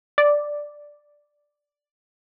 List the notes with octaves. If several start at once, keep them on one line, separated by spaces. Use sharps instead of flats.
D5